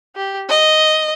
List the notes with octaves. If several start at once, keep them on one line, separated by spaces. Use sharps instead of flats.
G4
D#5